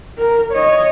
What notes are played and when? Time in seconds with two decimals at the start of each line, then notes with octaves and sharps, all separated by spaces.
0.18 A#4
0.52 C#5 D#5